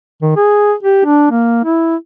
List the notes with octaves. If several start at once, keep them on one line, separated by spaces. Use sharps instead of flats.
D#3
G#4
G4
D4
A#3
E4